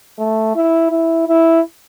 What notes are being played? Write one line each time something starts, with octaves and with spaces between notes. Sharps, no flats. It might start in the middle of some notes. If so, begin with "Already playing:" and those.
A3
E4
E4
E4